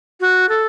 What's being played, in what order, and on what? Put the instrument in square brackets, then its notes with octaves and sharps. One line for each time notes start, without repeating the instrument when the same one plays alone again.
[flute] F#4
A4